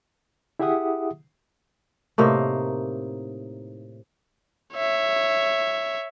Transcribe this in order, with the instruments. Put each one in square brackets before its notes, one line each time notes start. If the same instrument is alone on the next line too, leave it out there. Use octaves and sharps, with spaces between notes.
[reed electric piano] E4 G4 G#4 E5 F#5 D#6
[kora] A2 C3 A#3 D#4
[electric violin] C#5 E5